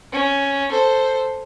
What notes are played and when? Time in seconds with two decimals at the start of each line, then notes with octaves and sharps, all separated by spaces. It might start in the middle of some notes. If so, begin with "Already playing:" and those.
0.12 C#4
0.70 A4 C5